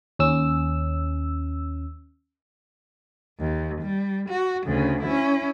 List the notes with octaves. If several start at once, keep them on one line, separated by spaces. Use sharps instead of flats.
D#2 C#4 E6
D#2
G3
F#4
D2 C#3
C#4 E4